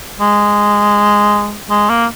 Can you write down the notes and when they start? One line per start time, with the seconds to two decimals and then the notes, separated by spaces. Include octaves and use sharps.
0.21 G#3
1.70 G#3
1.89 A#3